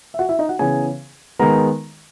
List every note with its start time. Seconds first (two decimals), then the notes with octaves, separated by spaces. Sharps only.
0.14 E5
0.19 F#4 F#5
0.29 E4 E5
0.39 D#4 D#5
0.49 F#4 F#5
0.59 C#3 E3 B3 G#4 G#5
1.39 D#3 G#3 B3 A#4 A#5